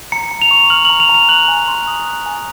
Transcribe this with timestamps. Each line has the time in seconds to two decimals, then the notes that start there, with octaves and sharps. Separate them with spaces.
0.12 A#5 C#7
0.31 A#5
0.42 F7
0.51 C#6
0.70 F6 F#7
0.85 A#5 F#7
1.00 F7
1.09 A#5
1.14 F7
1.29 F#6 F#7
1.48 G#5
1.68 C6
1.87 D#6
2.06 F#6
2.26 G#5